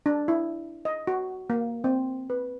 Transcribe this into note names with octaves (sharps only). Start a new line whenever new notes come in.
D4
E4
D#5
F#4
A#3
C4
B4